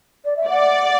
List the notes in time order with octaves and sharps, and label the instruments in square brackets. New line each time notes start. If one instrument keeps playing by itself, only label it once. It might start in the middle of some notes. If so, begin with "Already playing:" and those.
[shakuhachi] D5
E5
[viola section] D5 [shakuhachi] F#5